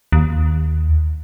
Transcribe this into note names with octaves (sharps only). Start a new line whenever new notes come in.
D#2